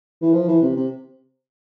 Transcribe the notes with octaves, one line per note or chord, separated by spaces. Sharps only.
E3
F3
E3
C3
C3